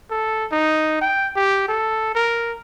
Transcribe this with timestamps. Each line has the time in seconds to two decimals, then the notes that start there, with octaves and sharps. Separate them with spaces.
0.11 A4
0.52 D#4
1.01 G5
1.36 G4
1.68 A4
2.15 A#4